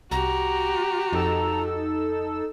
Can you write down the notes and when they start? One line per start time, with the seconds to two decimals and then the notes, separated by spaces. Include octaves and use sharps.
0.11 C2 F#4 G4 A#5
1.13 F2 D#4 A4 E6